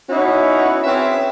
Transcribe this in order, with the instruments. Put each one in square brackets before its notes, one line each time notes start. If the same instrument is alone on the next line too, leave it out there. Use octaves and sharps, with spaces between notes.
[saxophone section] B3 C#4 D#4 E4 F#4
C4 C#4 G#4 B4 E5